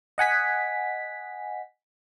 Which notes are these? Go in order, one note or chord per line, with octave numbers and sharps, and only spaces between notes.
D#5 F#5 G#5 B6